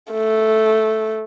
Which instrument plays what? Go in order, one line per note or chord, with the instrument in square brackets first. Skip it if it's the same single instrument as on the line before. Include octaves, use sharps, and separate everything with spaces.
[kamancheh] A3